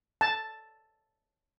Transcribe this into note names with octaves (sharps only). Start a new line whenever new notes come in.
A5